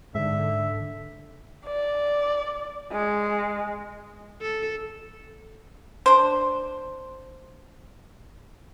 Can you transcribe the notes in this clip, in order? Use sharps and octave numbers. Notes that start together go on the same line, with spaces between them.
G#2 D3 E5
D5
G#3
A4
D4 C5